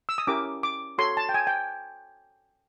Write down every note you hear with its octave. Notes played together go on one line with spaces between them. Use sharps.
E6
D#6
C#4 E4 G4 A#4 D6
D6
F#4 A4 C#5 C6
A5
G5
G#5
G5